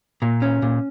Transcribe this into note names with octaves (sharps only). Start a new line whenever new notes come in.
A#2
C#4
A#2